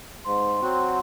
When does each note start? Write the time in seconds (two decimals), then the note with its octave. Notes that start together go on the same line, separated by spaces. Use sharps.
0.25 G#2 C6
0.62 F#3 C4 F#4